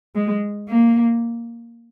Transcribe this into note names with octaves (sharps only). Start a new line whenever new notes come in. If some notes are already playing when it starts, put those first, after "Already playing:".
G#3
A#3